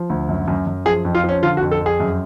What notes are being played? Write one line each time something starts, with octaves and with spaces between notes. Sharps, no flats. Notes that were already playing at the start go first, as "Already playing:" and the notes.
Already playing: F3
D2
F#2
F#2
F#2
F3 G#4
F2
F4
F3 C#4
D3 F4
F#4
F2
A4
F2
G#4
F#2